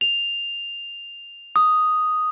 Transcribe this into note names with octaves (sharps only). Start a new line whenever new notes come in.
F7
D#6